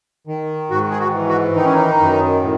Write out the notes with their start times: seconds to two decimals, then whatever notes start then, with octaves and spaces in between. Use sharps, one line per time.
0.27 D#3
0.71 G#2 F#4
0.91 G#4
1.00 F#4
1.13 E3
1.28 F#4
1.56 D#3 D#4
1.65 C#4
1.74 D#4
2.00 F#2
2.42 A2